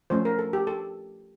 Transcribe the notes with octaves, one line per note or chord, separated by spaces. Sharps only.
F3 A3 C#4 C5
A#4
A4
G4
A4